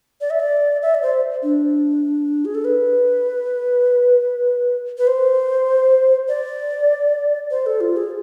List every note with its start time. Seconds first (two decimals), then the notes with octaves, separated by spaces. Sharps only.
0.21 D5
0.30 E5
0.40 D5
0.82 E5
0.95 D5
1.03 C5
1.43 D4
2.45 G#4
2.55 A4
2.65 B4
4.98 B4
5.07 C5
6.28 D5
7.51 C5
7.66 A4
7.81 F4
7.97 G#4